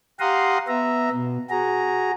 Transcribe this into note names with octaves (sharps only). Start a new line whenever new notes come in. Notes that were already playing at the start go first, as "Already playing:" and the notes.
G4 F5 F#5 A#5 C6 D#6
B3 E5 A#5
B2
F#4 G#4 A#5